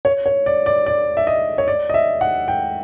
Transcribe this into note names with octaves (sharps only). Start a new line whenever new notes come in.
C#5
C#5
D5
D5
D5
E5
D#5
C#5
D5
D#5
E5
F#5
G5